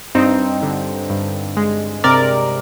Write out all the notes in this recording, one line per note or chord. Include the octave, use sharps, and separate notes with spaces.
G2 C4 D#4
D3
G2
G#3
C3 A#4 D5